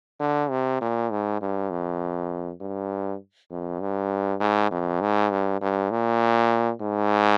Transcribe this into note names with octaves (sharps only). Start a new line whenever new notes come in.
D3
C3
A#2
G#2
G2
F2
G2
F2
G2
G#2
F2
G#2
G2
G2
A#2
G#2